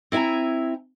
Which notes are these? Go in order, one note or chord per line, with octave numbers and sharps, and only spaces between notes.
C4 E4 E5 G#5 A#5